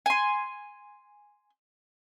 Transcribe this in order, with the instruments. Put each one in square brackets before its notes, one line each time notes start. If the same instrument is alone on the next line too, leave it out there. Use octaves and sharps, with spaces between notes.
[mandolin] G#5 C6